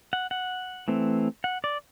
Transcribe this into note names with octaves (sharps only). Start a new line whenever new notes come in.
F#5
F#5
E3 A3 C4
F#5
D5